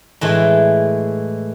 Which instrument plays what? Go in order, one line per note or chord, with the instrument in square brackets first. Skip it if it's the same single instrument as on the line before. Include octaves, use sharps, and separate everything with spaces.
[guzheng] A2 E3 G#3